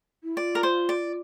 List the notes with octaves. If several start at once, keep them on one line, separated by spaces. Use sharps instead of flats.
E4
F4 D5
A#4
C5
D5